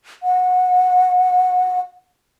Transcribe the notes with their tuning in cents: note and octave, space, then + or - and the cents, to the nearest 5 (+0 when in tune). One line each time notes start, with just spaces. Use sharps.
F#5 -20